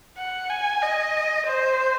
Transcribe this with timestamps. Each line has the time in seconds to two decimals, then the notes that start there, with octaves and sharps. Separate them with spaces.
0.18 F#5
0.50 G#5
0.82 D#5
1.47 C5